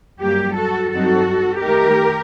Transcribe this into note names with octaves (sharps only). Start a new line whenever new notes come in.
G2 F#3 A#3 G4
F#4 A4
G2 F#3 C4 D#4 F#4 A4
D#3 A3 D#4 G4 A#4